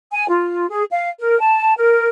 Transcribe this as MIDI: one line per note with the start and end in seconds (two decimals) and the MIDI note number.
0.11 0.25 80
0.29 0.67 65
0.70 0.83 68
0.90 1.08 77
1.19 1.37 70
1.40 1.75 81
1.77 2.09 70